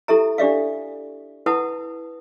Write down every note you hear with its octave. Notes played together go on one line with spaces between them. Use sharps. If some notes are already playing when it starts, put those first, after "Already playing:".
E4 G4 A4 E5 A#5
D4 G4 D5 E5 F5
E4 B4 F#5 A5 D#6